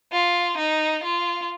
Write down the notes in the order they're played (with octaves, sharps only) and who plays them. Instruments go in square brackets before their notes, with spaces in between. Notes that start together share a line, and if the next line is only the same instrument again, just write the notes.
[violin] F4
D#4
F4